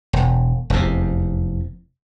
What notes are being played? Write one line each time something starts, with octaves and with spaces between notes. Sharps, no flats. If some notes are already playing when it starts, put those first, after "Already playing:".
E1
F1 E2 C3